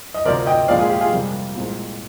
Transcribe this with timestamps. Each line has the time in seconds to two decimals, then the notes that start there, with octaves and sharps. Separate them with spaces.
0.14 D#5
0.25 D2 C3 F3 C4 A#4 D5
0.46 D#5 G5
0.68 A#1 A#2 F3 G#3 D5 F5
0.79 F4 G#4
0.90 G4
1.01 F4 G#4
1.12 F2 C3 G3 A#3
1.55 C2 A#2 G#3 C4